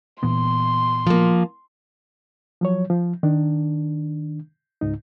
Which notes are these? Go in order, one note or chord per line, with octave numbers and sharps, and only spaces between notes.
A#2 E3 B3 C6
F3 A#3
F3 F#3 C#5
F3
D#3 D4
C#2 G#2 D#4